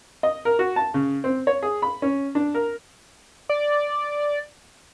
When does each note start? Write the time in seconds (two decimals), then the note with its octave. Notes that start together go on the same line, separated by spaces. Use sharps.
0.23 D#5
0.45 A#4
0.59 F#4
0.76 A5
0.94 C#3
1.24 C4
1.47 C#5
1.63 G#4
1.82 B5
2.02 C#4
2.35 D4
2.54 A#4
3.49 D5